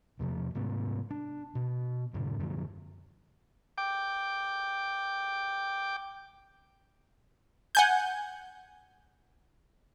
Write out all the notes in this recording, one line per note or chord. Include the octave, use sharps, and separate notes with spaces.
E2 C3 F3
G#2 C3 B3
D4
B2
F#2 A2 C#3
F#2 D3 F3
G5 D6
F#5 G#5 G6